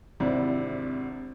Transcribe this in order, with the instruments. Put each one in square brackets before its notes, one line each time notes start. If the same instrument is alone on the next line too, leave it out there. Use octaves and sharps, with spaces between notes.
[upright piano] G#1 C3 D4 E4